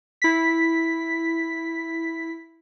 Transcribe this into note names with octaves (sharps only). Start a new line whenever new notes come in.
E4 B6